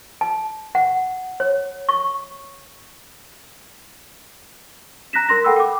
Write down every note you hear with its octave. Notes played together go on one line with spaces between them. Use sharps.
A5
F#5
C#5
C#6
A#5 F#6 A#6 B6 E7
A#4 C6 A#6
A4 F#5 G5 B5 E6
G5 D6